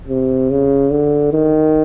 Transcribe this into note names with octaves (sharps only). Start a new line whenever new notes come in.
C3
C#3
D3
D#3